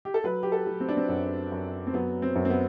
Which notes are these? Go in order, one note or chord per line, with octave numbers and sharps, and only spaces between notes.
G4
A4
F#3 B4
G4
A4
F#3
C4
D4
C4
F#2
F#2
C4
F#3 B3
C4
F#2
C4
B3